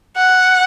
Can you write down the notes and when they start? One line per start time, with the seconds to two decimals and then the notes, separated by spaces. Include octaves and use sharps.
0.17 F#5